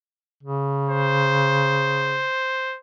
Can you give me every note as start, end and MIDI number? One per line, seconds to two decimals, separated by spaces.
0.43 2.26 49
0.89 2.78 72